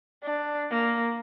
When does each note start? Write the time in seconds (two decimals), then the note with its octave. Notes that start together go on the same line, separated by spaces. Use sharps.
0.23 D4
0.71 A#3